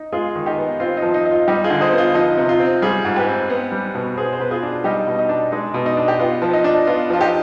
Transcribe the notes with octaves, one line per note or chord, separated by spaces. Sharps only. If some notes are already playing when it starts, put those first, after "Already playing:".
Already playing: D#4
G#3 F4 G#4
D#3
D#4 G4
B3
C4 F4
D#4
F3
D#4
D#4
F4
G3 D#4 G4
F4 G#4
D3
C5 D#5
B3
F4
F3 D#4
C3
F4
C4
G3 F4 G#4
G#2
G4 B4
C4
B3
G3
B2
B3 G#4 C5
C5
B2 B4
F4 G#4
D4
G3 D#4 G4
B2
D#4
D4
G#3 D#4
B2
D#4
D4
G4
B3 F4
F3
D#4
D4
B3 F4
F3 F4
D#4 G4